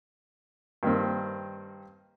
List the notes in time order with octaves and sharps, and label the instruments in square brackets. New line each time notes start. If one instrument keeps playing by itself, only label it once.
[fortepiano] G2 D#3 A#3 C4